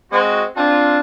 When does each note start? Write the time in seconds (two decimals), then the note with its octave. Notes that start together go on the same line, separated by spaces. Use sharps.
0.11 G#3 C4 F#4
0.55 C4 D4 F4